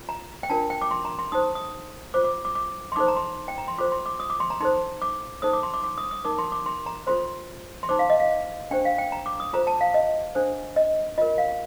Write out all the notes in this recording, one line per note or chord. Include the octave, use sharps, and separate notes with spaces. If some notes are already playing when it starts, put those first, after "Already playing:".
Already playing: F4
A#5
G5
D4 F4 A#4 A5
G5
D6
C6
A#5
C6
D#4 G4 C5 D#6
D#6
F4 C5 D6
D6
D6
D6
C6
D#4 A4 C5 D6
A#5
C6
G5
A#5
C6
F4 A4 C5 D6
C6
D6
D#6
D6
C6
A#5
D#4 A4 C5 C6
D6
D#4 A4 C5 D#6
D6
C6
D6
D6
D#6
D#6
D#4 A#4 D6
C6
D6
C6
A#5
F4 A4 C5 C6
C6
D#4 G4 C5 D6
F5
D#5
F5
D4 G4 C5 G5
F5
G5
A#5
D6
D#6
F4 A4 C5 A#5
A5
F5
D#5
D4 A4 C5
D#5
F4 A#4 D#5
F5